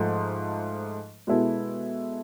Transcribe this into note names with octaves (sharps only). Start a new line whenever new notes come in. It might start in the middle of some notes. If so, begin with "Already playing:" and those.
Already playing: G#2 F3 A3
B2 G#3 B3 E4 A4